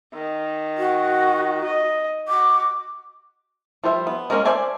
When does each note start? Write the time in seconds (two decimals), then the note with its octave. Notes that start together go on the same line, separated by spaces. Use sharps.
0.14 D#3
0.78 F#4
1.64 D#5
2.28 F#4 D6
3.84 F3 G3 C5 E5
4.07 B3
4.30 G#3 A#3 C4 C#4 A#4
4.45 C5 D5 E5 G#5 A5